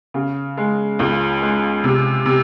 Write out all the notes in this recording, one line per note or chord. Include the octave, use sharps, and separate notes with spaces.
C#3
G#3
C#2
G#3
C3
C3